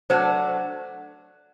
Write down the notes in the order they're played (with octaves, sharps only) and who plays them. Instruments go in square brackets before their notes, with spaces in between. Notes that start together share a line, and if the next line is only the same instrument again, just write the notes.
[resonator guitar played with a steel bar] F#3 A3 D4 F#4 [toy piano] C5